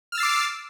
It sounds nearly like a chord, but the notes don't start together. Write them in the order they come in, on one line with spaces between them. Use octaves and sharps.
F6 E6 A6 C7 D6